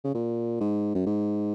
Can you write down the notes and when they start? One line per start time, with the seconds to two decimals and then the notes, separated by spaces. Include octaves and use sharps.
0.04 C#3
0.15 A#2
0.60 G#2
0.95 F#2
1.06 G#2